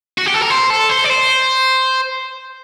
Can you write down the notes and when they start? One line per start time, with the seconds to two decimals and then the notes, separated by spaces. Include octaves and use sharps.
0.18 F#4
0.26 G4
0.34 A4
0.42 A#4
0.50 C5
0.70 A4
0.89 C5
1.04 D5
1.10 C5